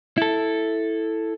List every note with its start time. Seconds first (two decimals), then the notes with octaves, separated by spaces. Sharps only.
0.18 E4 A4